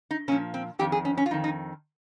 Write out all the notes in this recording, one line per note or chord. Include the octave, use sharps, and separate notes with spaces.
D#4
A#2 F3 C#4
C4
F2 D#3 G4
G#4
C#4
C#4
F4
F2 D#3 D#4
D#4